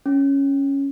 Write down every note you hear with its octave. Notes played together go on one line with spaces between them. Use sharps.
C#4